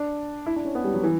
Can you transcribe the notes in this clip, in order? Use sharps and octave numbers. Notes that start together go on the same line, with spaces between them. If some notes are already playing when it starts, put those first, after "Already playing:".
Already playing: D4
E4
D4
C#4
B3
G3
F#3
E3